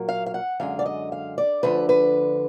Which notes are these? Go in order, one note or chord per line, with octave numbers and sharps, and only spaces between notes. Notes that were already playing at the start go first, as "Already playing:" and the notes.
Already playing: A#2 F#3 A#3
F5
F5
F#5
F#2 D3 G#3 F5
D5
D#5
F5
D5
D2 D3 F3 B4
B4